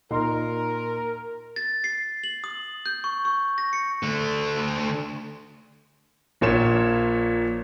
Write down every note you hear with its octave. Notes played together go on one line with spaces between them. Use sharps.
A#2 D#4 A#4 C6
A6
C7
F#7
D#6
G6
C#6
C#6
A#6
C#7
D3 A3
A#1 A#2 C#5 E7